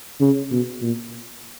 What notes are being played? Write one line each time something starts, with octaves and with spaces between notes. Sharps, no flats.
C#3
B2
A#2